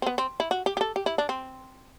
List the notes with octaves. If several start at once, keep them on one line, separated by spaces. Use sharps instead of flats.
C4
B3
C4
E4
F#4
G4
G4
A4
G4
E4
D4
C4